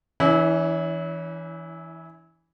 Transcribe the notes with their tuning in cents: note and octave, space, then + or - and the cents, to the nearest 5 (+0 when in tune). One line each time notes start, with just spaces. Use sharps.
E3 +0 C#4 +35 E4 -25